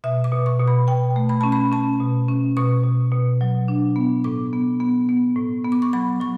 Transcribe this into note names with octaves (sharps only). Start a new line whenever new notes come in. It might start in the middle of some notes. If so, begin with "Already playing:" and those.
B2 E5
D6
B2
C#6
B2
B5
B2 G5
A3
B5
C#4 A5
B5
C#4 A5
B2
C#4
B2 C#6
B2
B2
F#3
D4
B3
A2 D6
B3
B3
B3
A2
B3
D6
C#6
F#3 B5
F#3 C#6